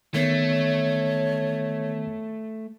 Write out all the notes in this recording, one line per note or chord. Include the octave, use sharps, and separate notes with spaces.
D#3 A3 B3 C#5 C7